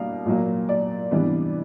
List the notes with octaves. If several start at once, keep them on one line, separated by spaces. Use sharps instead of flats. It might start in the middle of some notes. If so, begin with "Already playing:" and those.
Already playing: B2 G3 A#3 D4 F5
A#2 F#3 A#3
D5
C3 E3 G3 B3 D4